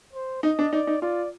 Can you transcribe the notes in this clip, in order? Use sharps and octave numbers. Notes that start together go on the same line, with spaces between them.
C5
D#4 D#5
D4
D#4 D5
D#4
F4 D5